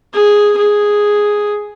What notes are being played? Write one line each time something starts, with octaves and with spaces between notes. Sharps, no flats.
G#4
G#4